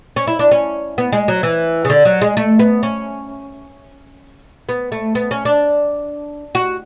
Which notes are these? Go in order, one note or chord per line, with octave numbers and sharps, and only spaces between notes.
C#4
E4
D4
C#4
B3
G#3
F#3
E3
C#3
D3
F#3
G#3
A3
B3
C#4
B3
A3
B3
C#4
D4
F#4